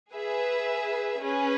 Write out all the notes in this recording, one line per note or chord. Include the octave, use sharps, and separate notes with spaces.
G#4 B4 E5
C#4 G#4 B4